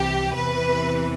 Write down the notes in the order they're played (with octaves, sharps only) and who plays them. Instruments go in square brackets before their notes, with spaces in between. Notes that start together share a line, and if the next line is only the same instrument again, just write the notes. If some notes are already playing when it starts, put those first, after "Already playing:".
Already playing: [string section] C2 C3 E3 G4
E2 C3 E3 B4